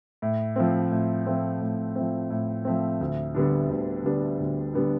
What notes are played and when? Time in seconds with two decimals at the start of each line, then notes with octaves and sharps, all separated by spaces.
0.22 A2
0.56 F3 A3 C4
0.91 A2
1.26 F3 A3 C4
1.61 A2
1.96 F3 A3 C4
2.30 A2
2.65 F3 A3 C4
3.01 D2
3.35 D3 G3 B3 D4
3.70 D2
4.04 D3 G3 B3 D4
4.40 D2
4.74 D3 G3 B3 D4